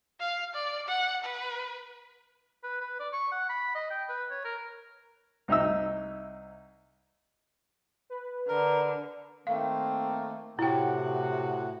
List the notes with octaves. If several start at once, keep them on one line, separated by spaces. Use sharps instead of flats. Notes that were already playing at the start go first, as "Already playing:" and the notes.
F5
D5
F#5
B4
B4
B4
D5
C#6
F#5
B5
D#5
G5
B4
C#5
A#4
C2 D#4 E5 E6
B4
D3 A#4
D#3 A3 A#3 C4 F5
A2 C3 E4 F#4 F#5 G5